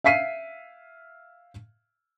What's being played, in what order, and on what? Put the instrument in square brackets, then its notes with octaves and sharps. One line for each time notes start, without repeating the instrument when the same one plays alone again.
[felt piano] E5 F5 B6 C7 D#7